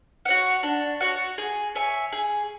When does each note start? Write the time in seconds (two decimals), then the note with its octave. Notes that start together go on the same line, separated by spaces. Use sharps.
0.25 F#4 C#5 F#5
0.63 D4
1.01 F#4 C#5 F#5
1.38 G#4
1.75 C#5 E5 G#5
2.12 G#4